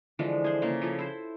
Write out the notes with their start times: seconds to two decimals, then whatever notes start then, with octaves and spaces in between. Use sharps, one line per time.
0.19 D3 E3 F3 G#3
0.44 G#4 C5
0.62 C#3 A#3
0.82 F3 E4 A4
0.99 E4 C5